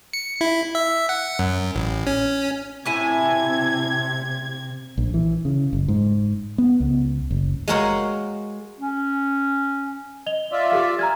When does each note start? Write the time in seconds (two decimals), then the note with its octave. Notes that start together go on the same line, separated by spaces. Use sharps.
0.13 C#7
0.41 E4
0.75 E5
1.09 F#5
1.39 F#2
1.75 A1
2.07 C#4
2.85 A2 C3 E4 G#5 G#6
4.98 A#1
5.14 E3
5.45 C#3
5.73 F#1
5.88 G#2
6.58 B3
6.80 C#2
7.31 F#1
7.68 G#3 A#3 F#4 A#4 C5 C#5
8.80 C#4
10.26 D#5 F7 G7
10.52 F4 D5 E5
10.71 G4 A4 F5
10.99 G#5 A#5 F6 G#6